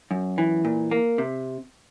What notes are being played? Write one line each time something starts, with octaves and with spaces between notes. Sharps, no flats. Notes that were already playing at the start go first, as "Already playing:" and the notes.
F#2
E3
A#2
A#3
C3